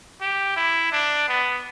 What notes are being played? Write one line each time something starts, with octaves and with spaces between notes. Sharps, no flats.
G4
E4
D4
B3